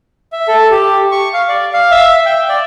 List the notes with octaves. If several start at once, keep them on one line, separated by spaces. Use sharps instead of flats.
E5
A4
G4
C#6
F5
D5
F5
E5
G5
D5